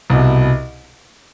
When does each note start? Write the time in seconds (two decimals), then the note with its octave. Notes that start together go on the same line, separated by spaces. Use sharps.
0.10 C2 B2